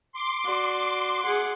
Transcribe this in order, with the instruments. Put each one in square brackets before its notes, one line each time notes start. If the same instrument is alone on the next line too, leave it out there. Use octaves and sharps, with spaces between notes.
[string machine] C6 D6
[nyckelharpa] F#4 D5
G#4 F#5